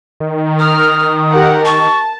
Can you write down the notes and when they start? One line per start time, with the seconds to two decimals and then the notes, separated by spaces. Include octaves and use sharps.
0.20 D#3
0.60 A#4 D#6 F6
1.33 G4 A#4 F#5
1.65 A5 C#6